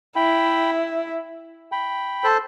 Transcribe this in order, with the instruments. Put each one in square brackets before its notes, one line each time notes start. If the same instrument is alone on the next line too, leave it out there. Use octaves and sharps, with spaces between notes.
[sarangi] E4 [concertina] G5 B5
[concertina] G5 B5
A4 C5